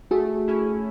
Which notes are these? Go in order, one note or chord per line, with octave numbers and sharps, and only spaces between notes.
A3 F#4 G#4
C#4 E4